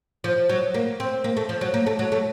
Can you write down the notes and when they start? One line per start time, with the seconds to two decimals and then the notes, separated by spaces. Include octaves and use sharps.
0.24 F3
0.49 F#3
0.74 A#3
1.00 C4
1.24 A#3
1.37 A3
1.49 F3
1.61 F#3
1.74 A#3
1.87 A3
1.99 F#3
2.12 A3